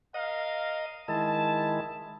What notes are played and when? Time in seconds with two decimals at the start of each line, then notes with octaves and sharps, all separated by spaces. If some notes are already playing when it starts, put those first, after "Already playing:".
0.14 A#4 D#5 F5
1.08 D#3 G#3 E4 A5